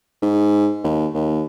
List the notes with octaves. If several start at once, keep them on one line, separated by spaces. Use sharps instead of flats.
G#2
D#2
D#2